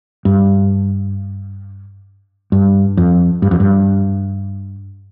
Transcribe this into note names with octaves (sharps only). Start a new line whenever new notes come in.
G2
G2
F2
G2
F2
G2